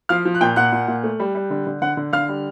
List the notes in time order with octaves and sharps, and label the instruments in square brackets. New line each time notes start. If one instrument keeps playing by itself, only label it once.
[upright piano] F3 F5 F6
F3
F#6
A#2 G5 G6
A#2 F#5 F#6
A#2
A#2
A3
G3
G3
D3
D3
D3 F#5 F#6
D3
D3 F5 F6
G3